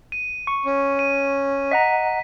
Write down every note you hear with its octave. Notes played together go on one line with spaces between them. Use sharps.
D#7
C#6
C#4
D#7
D#5 F#5 A#5 B6